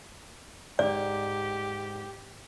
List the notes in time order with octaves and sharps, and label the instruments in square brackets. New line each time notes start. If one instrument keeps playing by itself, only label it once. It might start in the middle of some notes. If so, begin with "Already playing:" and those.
[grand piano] G#2 [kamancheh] G4 [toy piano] D5